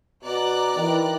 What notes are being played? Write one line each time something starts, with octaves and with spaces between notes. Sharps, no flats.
B2 D5 A#5 F#6
D#3 E3